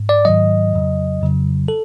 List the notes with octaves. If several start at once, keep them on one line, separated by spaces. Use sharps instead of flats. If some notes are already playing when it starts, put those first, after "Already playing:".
Already playing: G#2
D5
G#2 D#3 F#3 D#5
F2 C#3 F#3
F2 C#3 F#3
A4